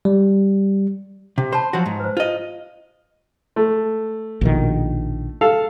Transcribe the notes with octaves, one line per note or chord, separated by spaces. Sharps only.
G3
C3
C5 A5 B5
F3 F#3 F#4
G#2
B4 C5
F4 D#5
A3
A#1 B2 D#3
A4 F5